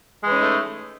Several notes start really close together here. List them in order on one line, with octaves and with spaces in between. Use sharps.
G#3 E3 C#4 D#4 A3